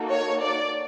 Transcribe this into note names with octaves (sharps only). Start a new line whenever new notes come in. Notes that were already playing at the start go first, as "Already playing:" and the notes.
Already playing: A#3 D#4 F#4 A4
C#5
D5